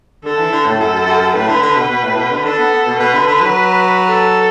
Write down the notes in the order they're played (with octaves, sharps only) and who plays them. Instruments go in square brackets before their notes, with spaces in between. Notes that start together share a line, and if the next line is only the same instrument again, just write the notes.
[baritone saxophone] D3 [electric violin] A4
[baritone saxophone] E3
D3
A2
[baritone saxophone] F#2 [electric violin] A4
[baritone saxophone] F#2
F#2
F#2
[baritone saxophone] A2 [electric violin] B4
[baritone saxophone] D3
D3
B2
B2
A2
B2
D3
[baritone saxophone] D4 [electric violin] A4
[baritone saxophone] B3
B3
B2
[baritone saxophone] B2 [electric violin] B4
[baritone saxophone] D3
D3
F#3
[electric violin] A4